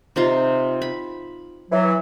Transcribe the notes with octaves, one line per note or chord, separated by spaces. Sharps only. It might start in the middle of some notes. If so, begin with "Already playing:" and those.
C3 D#4 F4
B5
E3 F#3